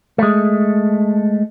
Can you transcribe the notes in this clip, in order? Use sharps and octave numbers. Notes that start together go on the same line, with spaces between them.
G#3 A3